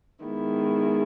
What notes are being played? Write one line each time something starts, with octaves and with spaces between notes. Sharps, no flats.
D#3 G#3 B3 E4